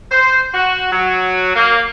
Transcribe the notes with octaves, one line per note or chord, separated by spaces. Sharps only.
C5
F#4
F#3
A#3